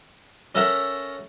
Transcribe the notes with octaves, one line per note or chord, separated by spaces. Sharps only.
C#4 A4 A#4 E5 F#5